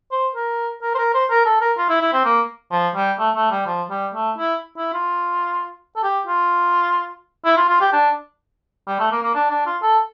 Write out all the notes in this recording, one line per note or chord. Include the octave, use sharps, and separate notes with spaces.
C5
A#4
A#4
C5
A#4
C5
A#4
A4
A#4
F4
E4
E4
C4
A#3
F3
G3
A3
A3
G3
F3
G3
A3
E4
E4
F4
A4
G4
F4
E4
F4
F4
G4
D4
G3
A3
A#3
A#3
D4
D4
F4
A4